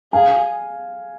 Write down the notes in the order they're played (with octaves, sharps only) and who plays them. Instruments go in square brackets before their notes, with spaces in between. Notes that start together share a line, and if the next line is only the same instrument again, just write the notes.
[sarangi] G#4 [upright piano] F5 G#5